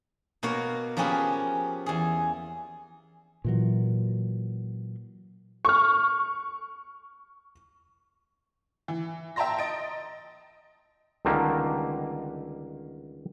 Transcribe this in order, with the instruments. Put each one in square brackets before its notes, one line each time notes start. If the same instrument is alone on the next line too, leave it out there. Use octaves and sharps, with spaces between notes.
[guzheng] B2 A#3 F#4 C#5 F5
F3 A#3 C#4 G4 G#4 B4
E2 G#4
[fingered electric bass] A#2 E3 F#3
[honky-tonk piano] C#6 F6
E3
E5 G5 A5 A#5 C6 A#6
D#5 A6 D7
[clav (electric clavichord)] C#2 D3 D#3 G3 A#3